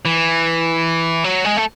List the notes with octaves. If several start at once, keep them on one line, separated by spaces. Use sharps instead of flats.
E3
F#3
G#3
A3